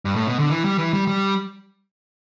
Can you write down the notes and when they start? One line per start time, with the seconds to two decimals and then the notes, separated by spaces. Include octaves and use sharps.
0.05 G2
0.16 A2
0.27 B2
0.39 D3
0.50 E3
0.64 G3
0.78 E3
0.93 G3
1.07 G3